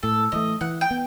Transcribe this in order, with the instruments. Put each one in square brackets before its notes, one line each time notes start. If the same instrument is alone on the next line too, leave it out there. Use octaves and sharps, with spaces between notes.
[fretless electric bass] A2 [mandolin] A4
[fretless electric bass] E3 A3 [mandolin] D#5
[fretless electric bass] E3 [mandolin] F#5
[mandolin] G5
[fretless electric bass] B3